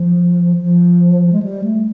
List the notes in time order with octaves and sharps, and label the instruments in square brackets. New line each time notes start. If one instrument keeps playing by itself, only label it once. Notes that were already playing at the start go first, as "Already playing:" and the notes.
Already playing: [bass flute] F3
F3
G#3
G3
A3